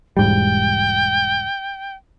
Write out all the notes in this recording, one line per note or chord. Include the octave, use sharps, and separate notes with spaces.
E1 G#2 G3 G5